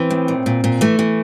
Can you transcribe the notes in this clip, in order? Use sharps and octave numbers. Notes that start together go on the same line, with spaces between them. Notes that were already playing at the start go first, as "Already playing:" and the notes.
Already playing: E3 C4
A2
A#2
A#2
A#2
E3 A3
E3